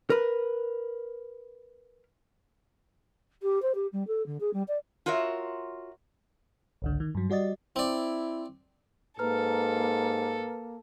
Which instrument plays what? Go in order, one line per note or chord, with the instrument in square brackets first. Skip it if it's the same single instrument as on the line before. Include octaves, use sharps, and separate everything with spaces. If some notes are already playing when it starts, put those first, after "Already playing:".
[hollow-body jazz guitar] A#4 B4
[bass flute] G4
C5
G4
G3
A4
D3
G#4
G3
D5
[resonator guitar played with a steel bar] F4 F#4 A#4 C#5 E5
[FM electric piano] G#1 C#2 D3
D#3
G2 F#3
G3 F#4 D5 D#5 A6
[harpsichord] C4 D5 [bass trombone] E4
[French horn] G#2 [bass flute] A#3 [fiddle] A4 [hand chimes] B4 A#5 F6